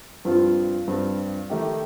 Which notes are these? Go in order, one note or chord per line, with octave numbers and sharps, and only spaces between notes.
G2 F3 C4 F4
G2 F3 C4 F4
D#3 A3 D#4 G4